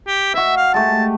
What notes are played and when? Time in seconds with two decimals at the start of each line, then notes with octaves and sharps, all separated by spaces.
0.07 G4
0.34 F#4 D#5 E5
0.57 F5
0.74 G#3 A3 G4 A5